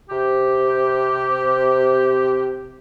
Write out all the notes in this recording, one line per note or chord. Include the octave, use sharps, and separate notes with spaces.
C3 G4